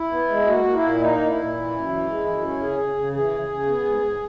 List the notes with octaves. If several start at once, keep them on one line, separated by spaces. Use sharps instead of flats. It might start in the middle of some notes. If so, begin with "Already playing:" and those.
Already playing: E4
B3
G#3
A#3 F#4
A#3
E4
A#2
A#3 D#4
A#2
E4
A#2
E3
F#2
E3
G#3
F#2
C#4
C#3 G#4
C#3
C#3
E3 G#4
C#3
C#3
B3
G#2
G#2